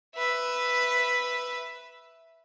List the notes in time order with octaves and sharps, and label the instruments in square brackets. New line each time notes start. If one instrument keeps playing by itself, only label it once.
[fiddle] B4 E5